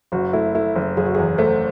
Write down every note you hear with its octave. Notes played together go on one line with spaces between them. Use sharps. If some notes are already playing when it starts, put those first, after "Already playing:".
F#1 F#4
A3 E4
A3 E4
F#1
F#1 G#4
F#4
E2 G#4
A3 C5